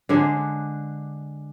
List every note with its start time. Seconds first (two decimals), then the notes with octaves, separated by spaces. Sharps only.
0.09 D3 G#3 D4